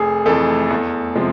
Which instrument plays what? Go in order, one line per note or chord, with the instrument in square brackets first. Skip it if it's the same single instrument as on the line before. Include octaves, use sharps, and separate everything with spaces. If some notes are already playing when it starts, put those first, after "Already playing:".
Already playing: [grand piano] F1 G#4
F2 E3 A3 A4
E2
C3 F3 G#3